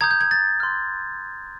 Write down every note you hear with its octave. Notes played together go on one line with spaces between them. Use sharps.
A#5 D#6 G6 G#6
G6
G#6
A6
C6 F6